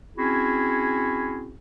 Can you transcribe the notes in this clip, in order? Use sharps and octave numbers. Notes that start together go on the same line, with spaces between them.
C4 C#4 E4 F#4 G#4